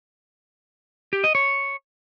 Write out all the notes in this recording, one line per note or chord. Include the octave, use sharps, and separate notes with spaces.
G4
D#5
C#5